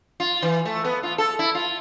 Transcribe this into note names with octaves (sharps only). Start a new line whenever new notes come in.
F4
E3
A3
B3
F4
A4
E4
F4